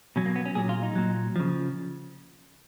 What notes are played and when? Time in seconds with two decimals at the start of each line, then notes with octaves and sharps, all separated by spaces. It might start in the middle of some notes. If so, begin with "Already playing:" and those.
0.16 B2 F#3 C#4
0.26 A#3
0.36 B3
0.45 C#4
0.55 A#2 F#3 G#4
0.69 F4
0.83 D#4
0.95 A#2 F#3
1.36 C#3 F3